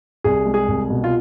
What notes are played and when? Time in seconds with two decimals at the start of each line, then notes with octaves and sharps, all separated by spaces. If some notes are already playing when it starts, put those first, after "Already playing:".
0.24 C2 G#4
0.46 G#3
0.54 G#4
0.68 C2
0.90 B2
1.04 F4